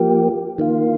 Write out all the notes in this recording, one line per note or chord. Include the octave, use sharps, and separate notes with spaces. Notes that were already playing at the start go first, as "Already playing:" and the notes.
Already playing: F3 A#3 G4
D#3 A#3 F4